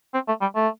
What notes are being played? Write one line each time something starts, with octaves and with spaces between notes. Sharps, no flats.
C4
A3
G3
A3